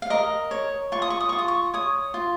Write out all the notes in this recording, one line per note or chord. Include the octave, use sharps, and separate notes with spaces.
F5
A#4 D#5
C#5
F4 C#6
D#6
C#6
D#6
F4 C#6
D#6
C#6
C#5 D#6
F4